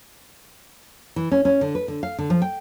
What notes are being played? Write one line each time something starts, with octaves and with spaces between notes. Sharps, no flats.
E3
C#4
C#4
D3
B4
D3
F5
D3
F3
G5